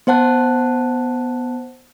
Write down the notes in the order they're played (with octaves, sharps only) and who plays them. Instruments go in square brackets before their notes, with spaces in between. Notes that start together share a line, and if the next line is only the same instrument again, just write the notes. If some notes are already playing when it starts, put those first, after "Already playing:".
[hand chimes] B3 C5 F#5 A5 F#6